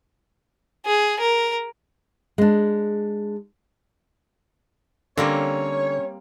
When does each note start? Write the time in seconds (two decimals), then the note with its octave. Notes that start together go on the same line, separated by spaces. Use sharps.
0.86 G#4
1.20 A#4
2.38 G#3 D4
5.18 D3 G3 A#3 C4 C#4 C#5